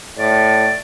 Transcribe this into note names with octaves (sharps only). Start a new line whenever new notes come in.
A2 D5